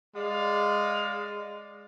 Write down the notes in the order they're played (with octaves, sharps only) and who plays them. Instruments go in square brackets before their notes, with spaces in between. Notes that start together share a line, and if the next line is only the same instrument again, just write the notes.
[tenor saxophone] G#3 [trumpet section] D5 F5